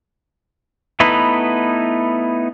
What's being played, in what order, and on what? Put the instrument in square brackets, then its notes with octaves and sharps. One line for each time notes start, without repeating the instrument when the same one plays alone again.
[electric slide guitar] A3 B3 D#4 E4 B4